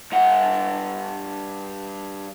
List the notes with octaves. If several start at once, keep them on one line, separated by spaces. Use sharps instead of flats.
G2 F#5